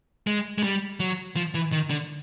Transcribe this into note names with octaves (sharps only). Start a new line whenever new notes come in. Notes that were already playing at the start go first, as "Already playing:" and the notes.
G#3
G#3
G3
F#3
F3
E3
D#3
D3